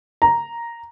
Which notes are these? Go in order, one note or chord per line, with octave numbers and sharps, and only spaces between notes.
A#5